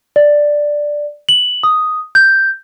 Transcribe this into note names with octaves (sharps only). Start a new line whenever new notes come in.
D5
F#7
D#6
G6